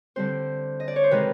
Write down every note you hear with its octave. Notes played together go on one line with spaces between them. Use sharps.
D3 G3 C4 C5
D#5
D5
C#5
C5
C3 D#3 G#3 C4 D#4 B4